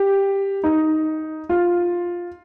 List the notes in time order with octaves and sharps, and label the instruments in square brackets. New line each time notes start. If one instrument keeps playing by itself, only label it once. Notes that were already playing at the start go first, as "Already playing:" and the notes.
Already playing: [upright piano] G4
D#4
F4